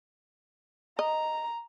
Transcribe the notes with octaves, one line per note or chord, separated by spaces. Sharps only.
D#5 A#5